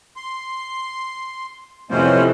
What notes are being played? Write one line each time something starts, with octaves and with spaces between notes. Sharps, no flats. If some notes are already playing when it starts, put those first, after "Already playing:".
C6
F2 C3 E3 C#4 E4 C5 D#5